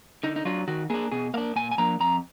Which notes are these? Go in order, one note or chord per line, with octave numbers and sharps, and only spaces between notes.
D3 D#4
D#4
F#3 D4 F4
D#3 F#4
A#3 D4 G#4
B2 G#4
A#3 D4 F5
A#2 G#5
G#5
F3 A#3 D4 A#5
F2 A#5